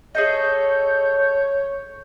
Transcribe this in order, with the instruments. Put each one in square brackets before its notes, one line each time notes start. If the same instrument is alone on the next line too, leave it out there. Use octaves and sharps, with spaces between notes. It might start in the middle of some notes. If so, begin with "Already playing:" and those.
[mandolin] G#4 A4 D#5 [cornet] C#5 [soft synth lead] G6